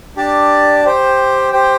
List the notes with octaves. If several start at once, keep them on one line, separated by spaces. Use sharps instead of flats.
D4 G4 D5 A5
G4 C5 G5
G4 C5 G5